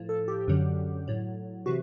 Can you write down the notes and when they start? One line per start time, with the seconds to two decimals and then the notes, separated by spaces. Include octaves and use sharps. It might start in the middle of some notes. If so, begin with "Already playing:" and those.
Already playing: A2 F3
0.09 A4
0.28 G4
0.48 F#2 D3 F#3
1.08 A2 F#3
1.66 C3 E3 F#4